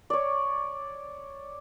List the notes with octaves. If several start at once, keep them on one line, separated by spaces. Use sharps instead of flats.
C#5 D5